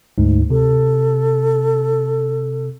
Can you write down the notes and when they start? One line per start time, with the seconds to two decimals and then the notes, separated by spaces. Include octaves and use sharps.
0.18 D2 G#2
0.50 C3 A4